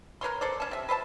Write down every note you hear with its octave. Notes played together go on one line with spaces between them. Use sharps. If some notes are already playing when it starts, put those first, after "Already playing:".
A#4 B4 C#5 C6
A4 C5 D5
C#4 A5
C3 E5
B4 C5 D#5 A5